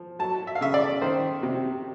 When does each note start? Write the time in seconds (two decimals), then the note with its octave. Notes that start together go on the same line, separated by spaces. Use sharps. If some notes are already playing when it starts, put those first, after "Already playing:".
Already playing: F3
0.19 F#3 A5
0.47 E5
0.55 F5
0.61 C#3 E5
0.74 D5
1.02 D#3 C5
1.43 C3